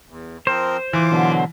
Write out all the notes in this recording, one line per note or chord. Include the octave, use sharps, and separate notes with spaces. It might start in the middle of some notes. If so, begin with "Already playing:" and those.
E2
F3 C4 A#4 C5
E3 F4 D6
B2 D3 F#3